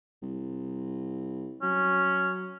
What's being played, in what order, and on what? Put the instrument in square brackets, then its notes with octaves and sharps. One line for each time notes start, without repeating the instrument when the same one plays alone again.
[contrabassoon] C2
[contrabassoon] F#3 [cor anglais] C#4